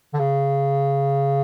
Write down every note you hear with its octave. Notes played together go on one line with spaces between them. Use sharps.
D3
C#3